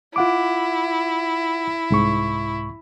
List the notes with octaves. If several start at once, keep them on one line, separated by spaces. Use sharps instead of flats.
E4 F4 F#5 D6
C2 G#2 C#6